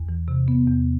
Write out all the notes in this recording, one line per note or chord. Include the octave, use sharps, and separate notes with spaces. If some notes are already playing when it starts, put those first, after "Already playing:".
Already playing: E2
E3
C3
B3
E2